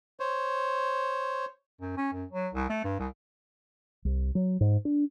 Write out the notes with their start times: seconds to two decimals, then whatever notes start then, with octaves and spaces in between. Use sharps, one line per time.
0.20 C5 C#5
1.81 F#2
1.97 C#4
2.13 F#2
2.31 F#3
2.54 C2
2.69 A3
2.84 G2
2.99 C2
4.05 C2
4.35 F#3
4.61 G#2
4.85 D4